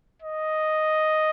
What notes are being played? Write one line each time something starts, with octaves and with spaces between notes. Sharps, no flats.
D#5